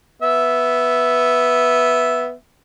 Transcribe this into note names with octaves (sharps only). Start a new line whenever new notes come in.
B3 E5